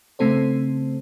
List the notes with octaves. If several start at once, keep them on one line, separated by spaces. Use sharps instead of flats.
C#3 A3 C4 A4 C5